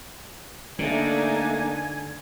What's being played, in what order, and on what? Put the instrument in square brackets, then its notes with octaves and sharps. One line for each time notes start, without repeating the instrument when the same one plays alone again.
[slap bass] D3 [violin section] A3 D4 D#4 [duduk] A#3 [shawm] G#5